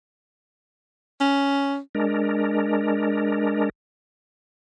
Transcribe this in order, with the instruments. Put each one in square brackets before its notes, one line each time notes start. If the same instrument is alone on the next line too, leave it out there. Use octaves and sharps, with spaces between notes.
[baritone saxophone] C#4
[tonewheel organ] G#3 D4 A#4